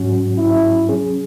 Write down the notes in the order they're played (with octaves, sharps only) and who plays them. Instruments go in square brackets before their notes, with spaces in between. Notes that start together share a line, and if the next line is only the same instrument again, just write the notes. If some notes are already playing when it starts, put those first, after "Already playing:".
Already playing: [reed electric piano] G#2 F#3 C#4 F#4
[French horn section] E4
[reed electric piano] F#3 C#4 G#4